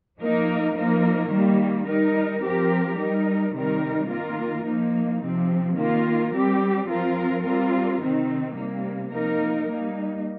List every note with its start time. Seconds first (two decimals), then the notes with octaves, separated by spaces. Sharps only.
0.19 F3 A#3 D#4 A#4
0.74 F3 A#3 D#4 A#4
1.31 D#3 G3 A#3
1.86 G3 D#4 A#4
2.42 F3 C4 G4 A#4
2.97 G3 D#4 A#4
3.54 C3 D#3 G3 D#4 A#4
4.09 D#3 A#3 F4 A#4
4.65 F3 A#3 D#4
5.21 C3 F3 C4
5.76 D#3 A#3 F4 A#4
6.33 G3 C4 G4
6.89 F3 C4 F4 A#4
7.44 G3 C4 F4 A#4
8.00 C3 D#3 C4 D#4
8.56 C3 G3 A#3
9.12 F3 A#3 D#4 A#4
9.68 G3 A#3 D#4